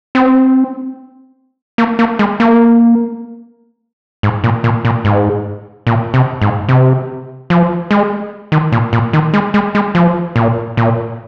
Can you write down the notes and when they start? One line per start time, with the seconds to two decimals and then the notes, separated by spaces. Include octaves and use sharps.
0.15 C4
1.78 A#3
1.99 A#3
2.19 G#3
2.40 A#3
4.23 G#2
4.44 A#2
4.64 A#2
4.85 A#2
5.05 G#2
5.87 A#2
6.14 C3
6.42 G#2
6.69 C3
7.50 F3
7.91 G#3
8.52 D#3
8.72 A#2
8.93 A#2
9.13 D#3
9.34 G#3
9.54 G#3
9.75 G#3
9.95 F3
10.36 A#2
10.77 A#2